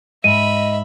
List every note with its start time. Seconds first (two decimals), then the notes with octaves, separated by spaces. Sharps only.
0.24 G#2 D#5 E5 B5 D#7